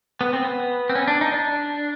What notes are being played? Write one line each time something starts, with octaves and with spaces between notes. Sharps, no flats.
B3
C4
B3
C4
C#4
D4
D#4
D4